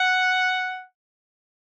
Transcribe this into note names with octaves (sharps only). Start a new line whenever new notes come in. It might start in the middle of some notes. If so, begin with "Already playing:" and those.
Already playing: F#5